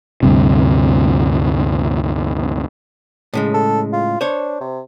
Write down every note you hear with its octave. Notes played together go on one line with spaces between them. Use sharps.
D2 G2 C3
A2 C#3 G#3
A4
F4
D4 C5 C#5
C3